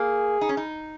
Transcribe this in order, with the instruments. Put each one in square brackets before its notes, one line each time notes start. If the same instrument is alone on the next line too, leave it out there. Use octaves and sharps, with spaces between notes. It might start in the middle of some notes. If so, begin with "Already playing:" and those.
Already playing: [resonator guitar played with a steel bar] A#3 [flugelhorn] G#4
[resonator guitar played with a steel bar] D#4
C#4
D#4